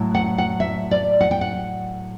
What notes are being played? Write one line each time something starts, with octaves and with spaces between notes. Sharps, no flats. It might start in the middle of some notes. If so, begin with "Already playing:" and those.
Already playing: A2 F#3
F#5
F#5
E5
D5
F#5
G5
F#5